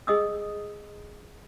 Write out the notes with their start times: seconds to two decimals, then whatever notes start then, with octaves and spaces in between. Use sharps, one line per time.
0.07 G#4 D#5 D#6 E6